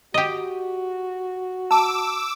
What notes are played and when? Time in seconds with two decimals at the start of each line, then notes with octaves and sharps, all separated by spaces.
0.14 F#4 G4 D#5
1.71 A5 D6 E6